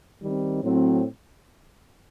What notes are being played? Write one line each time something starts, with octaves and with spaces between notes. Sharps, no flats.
D#3 G3 C4
A2 F#3 C4